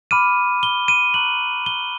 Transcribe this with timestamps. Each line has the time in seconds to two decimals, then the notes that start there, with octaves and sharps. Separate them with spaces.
0.11 B5 D6 F6 D#7
0.63 G7
0.88 D#7
1.14 A#5 C#6 F#6 F#7
1.66 G7